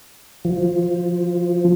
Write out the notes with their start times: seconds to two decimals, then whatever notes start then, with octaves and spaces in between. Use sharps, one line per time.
0.45 F3